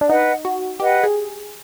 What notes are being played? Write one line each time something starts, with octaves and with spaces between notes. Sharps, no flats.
D4
D#4 B4 D#5 F#5
F#4
G4 B4 D#5 F#5
G#4